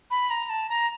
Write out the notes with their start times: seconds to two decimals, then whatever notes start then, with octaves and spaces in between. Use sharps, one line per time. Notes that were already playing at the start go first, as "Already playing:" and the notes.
0.11 B5
0.30 A#5
0.50 A5
0.69 A#5